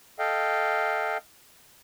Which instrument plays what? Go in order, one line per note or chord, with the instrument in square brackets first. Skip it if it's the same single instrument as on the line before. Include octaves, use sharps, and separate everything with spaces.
[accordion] A4 D#5 F5 G5